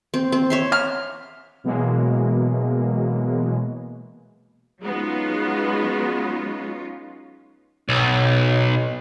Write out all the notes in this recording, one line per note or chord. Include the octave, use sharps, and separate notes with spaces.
C4
C4
C#5 E5 C6
F6
B2 E3 F#3 G#3 A#3
F#3 G#3 B3 C#4 D#4 F4
B1